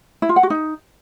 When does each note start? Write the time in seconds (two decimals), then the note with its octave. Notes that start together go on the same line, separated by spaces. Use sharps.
0.22 E4
0.29 F4
0.36 F#5
0.43 F#4
0.50 D#4